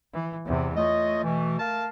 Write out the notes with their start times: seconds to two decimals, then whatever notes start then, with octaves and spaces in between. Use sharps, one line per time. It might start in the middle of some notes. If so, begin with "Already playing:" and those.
0.13 E3
0.46 E2 C3
0.76 A3 F4 C#5 D#5
1.23 B2 E3
1.58 A#4 F5 A5